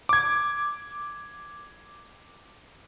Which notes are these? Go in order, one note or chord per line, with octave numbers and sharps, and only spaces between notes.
D6 G#6